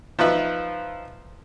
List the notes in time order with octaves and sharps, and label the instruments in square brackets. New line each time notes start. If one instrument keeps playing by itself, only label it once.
[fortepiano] F3 D#4 F4 B4 E5